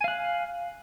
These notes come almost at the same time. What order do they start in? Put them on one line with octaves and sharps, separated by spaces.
G#5 F5 F#6